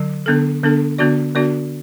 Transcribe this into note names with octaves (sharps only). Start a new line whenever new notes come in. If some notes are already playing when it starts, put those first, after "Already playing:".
Already playing: D3 F#3
D3 B3 D4 A4
D3 B3 D4 A4
D3 B3 D4 F#4 D5
D3 B3 D4 F#4 D5